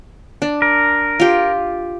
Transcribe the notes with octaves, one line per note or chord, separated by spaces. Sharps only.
D4
A#4
F4 G4